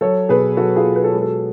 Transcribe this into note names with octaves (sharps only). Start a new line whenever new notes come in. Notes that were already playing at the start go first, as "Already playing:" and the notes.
F#3 A4 C#5
B2 G#4 B4
F#3 F#4 A4
F4 G#4
B2
B4
A4
G#3 G#4
F#4 A4